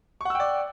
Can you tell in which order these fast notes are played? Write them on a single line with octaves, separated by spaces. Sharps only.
C#6 F#5 E6 G5 D5